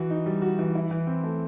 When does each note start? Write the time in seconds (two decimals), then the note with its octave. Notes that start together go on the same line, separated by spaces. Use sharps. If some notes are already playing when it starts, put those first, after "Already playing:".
Already playing: E3 F#4
0.10 D#4
0.26 G3
0.42 F#4
0.59 E3
0.75 E4
0.91 E3
1.07 C4
1.24 A3